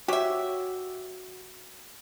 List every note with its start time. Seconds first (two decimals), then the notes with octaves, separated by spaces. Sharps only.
0.08 F#4 G4 C#5 E5